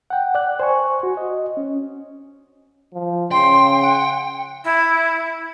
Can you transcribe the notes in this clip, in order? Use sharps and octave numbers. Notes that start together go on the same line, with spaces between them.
F#5 G5
D5 F#6
C5 G#5 C#6
F#4
D#5
C#4
F3
C#3 G5 C6
F#5
E4